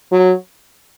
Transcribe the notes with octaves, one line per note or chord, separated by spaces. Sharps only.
F#3